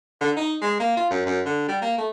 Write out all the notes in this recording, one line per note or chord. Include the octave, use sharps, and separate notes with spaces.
D3
D#4
G#3
A#3
F4
F#2
F#2
D3
G3
A#3
A3